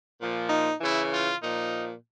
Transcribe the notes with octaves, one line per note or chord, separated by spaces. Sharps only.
A#2 F3
D#4
C#3 E3 E4
F4
A#2 F3 D#4